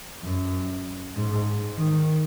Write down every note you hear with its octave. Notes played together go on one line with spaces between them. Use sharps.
F#2
G#2
D#3